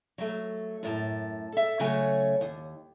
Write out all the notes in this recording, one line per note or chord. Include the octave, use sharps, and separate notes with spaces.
F#3 A3
F#2 A2 A5
A4 E5
C#3 F#3 A3 C#5 G#5
D#2